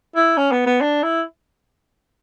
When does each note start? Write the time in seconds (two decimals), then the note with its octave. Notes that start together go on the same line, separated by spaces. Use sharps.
0.16 E4
0.37 C#4
0.52 B3
0.66 B3
0.81 D4
1.03 E4